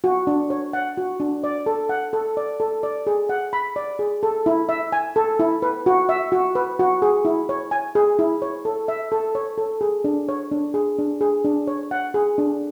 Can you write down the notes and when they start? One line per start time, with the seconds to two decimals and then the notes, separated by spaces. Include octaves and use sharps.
0.04 F#4
0.27 D4
0.50 C#5
0.73 F#5
0.97 F#4
1.20 D4
1.44 D5
1.66 A4
1.89 F#5
2.13 A4
2.37 D5
2.60 A4
2.83 D5
3.07 G#4
3.29 F#5
3.53 B5
3.76 D5
3.99 G#4
4.23 A4
4.46 E4
4.69 E5
4.92 G#5
5.16 A4
5.39 E4
5.62 B4
5.86 F#4
6.09 E5
6.32 F#4
6.55 B4
6.79 F#4
7.02 G#4
7.25 E4
7.49 C#5
7.71 G#5
7.95 G#4
8.19 E4
8.42 C#5
8.65 A4
8.88 E5
9.12 A4
9.35 C#5
9.58 A4
9.81 G#4
10.04 D4
10.29 C#5
10.52 D4
10.74 G#4
10.98 D4
11.21 G#4
11.45 D4
11.67 C#5
11.91 F#5
12.14 G#4
12.38 D4